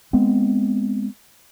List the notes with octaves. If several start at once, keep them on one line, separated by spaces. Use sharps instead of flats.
G#3 B3 C4